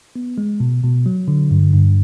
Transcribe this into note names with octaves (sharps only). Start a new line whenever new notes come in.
B3
G#3
B2
B2
F#3
D3
G2
G2